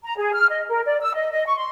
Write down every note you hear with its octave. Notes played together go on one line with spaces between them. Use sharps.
A#5
G#4
F6
D#5
A#4
D5
E6
D#5
D#5
C#6
C6